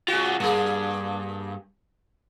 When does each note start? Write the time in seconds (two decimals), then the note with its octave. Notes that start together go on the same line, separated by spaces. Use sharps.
0.08 F4 F#4 G#4
0.40 G2 A#3 G#4